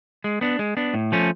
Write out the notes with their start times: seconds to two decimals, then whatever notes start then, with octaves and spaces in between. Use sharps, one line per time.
0.24 G#3
0.41 B3 D4
0.59 G#3
0.77 B3 D4
0.94 A2
1.12 F3 A3 C#4